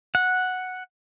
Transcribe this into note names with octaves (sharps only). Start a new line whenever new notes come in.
F#5